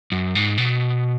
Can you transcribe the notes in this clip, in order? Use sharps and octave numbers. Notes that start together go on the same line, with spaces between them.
F#2
G#2
B2